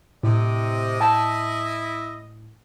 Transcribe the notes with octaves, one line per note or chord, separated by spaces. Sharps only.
A2 C3 D#5
E4 G5 A5